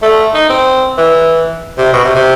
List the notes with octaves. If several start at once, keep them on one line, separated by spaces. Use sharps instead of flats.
A3
D#4
C4
E3
C3
B2
C3
C3